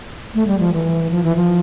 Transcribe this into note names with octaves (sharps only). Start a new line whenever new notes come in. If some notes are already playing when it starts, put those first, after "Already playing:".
A3
G3
F3
E3
F3
E3
F3